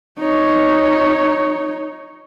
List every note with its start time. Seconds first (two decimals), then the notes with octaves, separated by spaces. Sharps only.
0.19 D#4 C#5